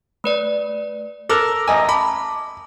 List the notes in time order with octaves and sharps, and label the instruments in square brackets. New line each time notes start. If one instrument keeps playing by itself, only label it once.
[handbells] A3 B4 D5
[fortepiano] A4 A#4 [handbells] D6 F#6
[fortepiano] A1 D#5 G#5 [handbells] A#5
[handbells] A5 D6 [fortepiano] B5